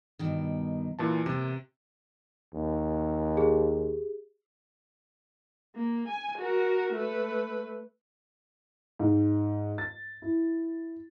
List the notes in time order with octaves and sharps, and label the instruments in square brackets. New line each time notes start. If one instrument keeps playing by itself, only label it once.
[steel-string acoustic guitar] G2 B2 D#3
[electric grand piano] A#2 E3 A5
[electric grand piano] C3 [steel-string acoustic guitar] A#3 B3
[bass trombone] D#2
[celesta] G4 G#4
[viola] A#3
G#5
F#4 A#4
A3 B4
[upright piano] G#2
A6
E4